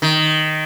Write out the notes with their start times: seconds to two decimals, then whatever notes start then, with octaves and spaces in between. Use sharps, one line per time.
0.02 D#3